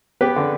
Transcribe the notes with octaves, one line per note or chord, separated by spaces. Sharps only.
B3 G4 B4
D3